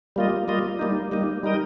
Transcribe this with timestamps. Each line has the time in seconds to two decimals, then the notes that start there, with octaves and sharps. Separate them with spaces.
0.16 G3 A#3 F4 D#5
0.48 G3 A#3 F4 D#5
0.79 G3 A#3 D#4
1.11 G3 A#3 D#4
1.43 G3 D#4 A#4 D#5